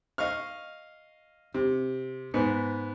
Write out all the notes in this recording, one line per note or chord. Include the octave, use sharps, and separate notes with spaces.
D#5 F5 C#6 F6
C3
G#2 B3